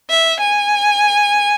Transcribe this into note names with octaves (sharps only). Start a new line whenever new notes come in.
E5
G#5